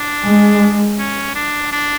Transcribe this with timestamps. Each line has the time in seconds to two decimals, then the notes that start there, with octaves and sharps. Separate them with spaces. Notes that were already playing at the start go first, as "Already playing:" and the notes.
Already playing: D4
0.26 G#3
0.99 C#4
1.35 D4
1.72 D4